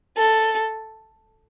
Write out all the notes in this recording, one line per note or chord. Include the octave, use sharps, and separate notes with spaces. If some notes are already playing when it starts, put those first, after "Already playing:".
A4